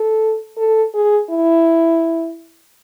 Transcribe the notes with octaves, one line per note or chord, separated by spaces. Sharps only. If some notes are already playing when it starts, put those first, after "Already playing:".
Already playing: A4
A4
G#4
E4